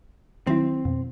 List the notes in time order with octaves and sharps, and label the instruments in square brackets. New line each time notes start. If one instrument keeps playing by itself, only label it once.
[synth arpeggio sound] D#3 F#3 E4 [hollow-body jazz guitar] C4
[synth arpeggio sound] F2 B2